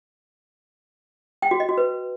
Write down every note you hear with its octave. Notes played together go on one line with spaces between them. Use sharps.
G5
F#4
D#5
F#4
B4